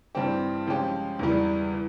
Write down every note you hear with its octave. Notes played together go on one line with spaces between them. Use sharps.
G2 E3 G3 C4 G4
F3 G#3 C#4 G4
E2 E3 G3
E3